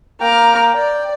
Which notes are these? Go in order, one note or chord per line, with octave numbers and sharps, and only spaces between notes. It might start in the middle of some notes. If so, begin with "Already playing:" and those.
A#3 G5 A#5 D6 F6
D5 G5